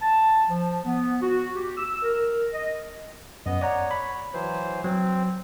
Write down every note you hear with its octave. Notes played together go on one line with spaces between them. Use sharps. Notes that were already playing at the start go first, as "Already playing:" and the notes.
A5
F3
B3
F#4
G4
E6
A#4
D#5
F#2 B3 D#5
C#5 D5 F#5 A#5
B5
E3 F#3 C5
F#3 C4